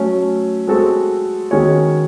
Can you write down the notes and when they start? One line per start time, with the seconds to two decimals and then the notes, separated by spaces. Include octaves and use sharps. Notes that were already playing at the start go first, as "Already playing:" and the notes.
Already playing: F#3 A3 C#4
0.68 G#3 C4 F#4 A4
1.51 D#3 G#3 C#4 F#4 C#5